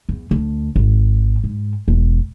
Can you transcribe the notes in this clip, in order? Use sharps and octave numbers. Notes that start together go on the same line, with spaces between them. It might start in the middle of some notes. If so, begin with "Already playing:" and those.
E2
D2
G#1
G#2
E1